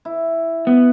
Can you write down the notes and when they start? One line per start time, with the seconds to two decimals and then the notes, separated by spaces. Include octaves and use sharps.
0.05 E4
0.67 B3